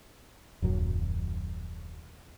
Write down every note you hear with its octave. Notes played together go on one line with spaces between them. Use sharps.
D#1 F#2 F#3